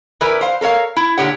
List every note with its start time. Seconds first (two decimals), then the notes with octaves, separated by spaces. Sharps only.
0.21 E3 E4 A#4 B4 D5
0.41 C5 F5
0.61 A4 A#4 C#5 F5
0.97 E4
1.18 A#2 D3 D4 G4 C#5 F#5